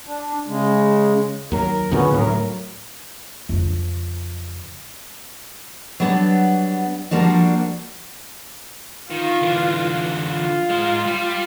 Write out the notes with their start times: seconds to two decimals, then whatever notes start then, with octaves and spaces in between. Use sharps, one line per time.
0.06 D4
0.47 C#3 G#3
1.52 D#2 F#3 A#4
1.91 D2 A#2 C#3 B3 C#4
2.14 D2 A2 F#3 A#4
3.49 F2 C#3
6.00 F#3 G3 B3 D4
7.11 F3 G3 A#3 D4 F#4
9.11 D#3 F4
9.41 D3 E3
10.31 F4
10.70 G#3 C5
11.06 G3